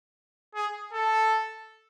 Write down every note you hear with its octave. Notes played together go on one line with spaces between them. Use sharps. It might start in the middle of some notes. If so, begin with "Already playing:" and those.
G#4
A4